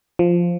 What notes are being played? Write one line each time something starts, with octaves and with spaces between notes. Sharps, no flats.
F3